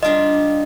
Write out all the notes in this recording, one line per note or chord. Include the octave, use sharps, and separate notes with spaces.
G3 A#3 D4 F4 D#5